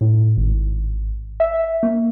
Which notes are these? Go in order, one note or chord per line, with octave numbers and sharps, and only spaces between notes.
A2
G#1
E5
A#3